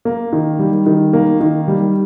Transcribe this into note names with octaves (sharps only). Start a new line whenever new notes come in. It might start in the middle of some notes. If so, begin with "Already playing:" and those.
A#3
D#3
G3
D#3
A#3
D#3
G3